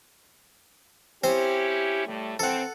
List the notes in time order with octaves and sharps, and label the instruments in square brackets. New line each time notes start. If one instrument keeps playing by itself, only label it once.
[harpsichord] C4 C5 [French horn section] C#4 E4 G4
[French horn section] A2 G3 A3
[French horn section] E3 C4 [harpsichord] A4 F#5